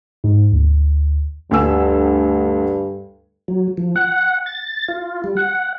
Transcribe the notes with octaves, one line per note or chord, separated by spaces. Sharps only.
G#2
D2
D2 G2 G#5 E6
F#3
F3
F#5
A6
F4
G3
F#5